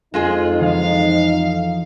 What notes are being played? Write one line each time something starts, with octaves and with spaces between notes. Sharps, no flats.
F2 G#3 D#4 F4 G#4
E3 F3 F5